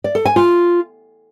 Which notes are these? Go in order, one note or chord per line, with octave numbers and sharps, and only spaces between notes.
D5
A4
G#5
F4